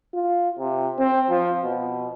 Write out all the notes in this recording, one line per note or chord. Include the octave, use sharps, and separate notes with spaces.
F4
C3
C4
F3
B2